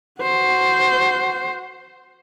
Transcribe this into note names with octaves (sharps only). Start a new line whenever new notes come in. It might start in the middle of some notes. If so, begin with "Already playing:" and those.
F#4 C5